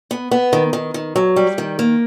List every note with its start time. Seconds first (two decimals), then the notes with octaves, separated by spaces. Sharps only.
0.11 B3
0.31 B3
0.53 D#3
0.73 D#3
0.94 D#3
1.16 F#3
1.36 G3
1.58 D#3
1.79 A#3